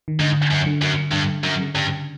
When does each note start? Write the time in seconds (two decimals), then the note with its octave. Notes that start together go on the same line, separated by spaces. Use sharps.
0.08 D#3
0.19 G#2 D3
0.51 F#2
0.66 D3
0.82 F#2
1.12 G2 D3
1.44 F#2
1.60 C#3
1.75 G2